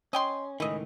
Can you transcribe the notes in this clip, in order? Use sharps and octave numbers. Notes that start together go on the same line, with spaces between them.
C#4 D#5 G5 C6
C#2 A2 D#3 E3 D#5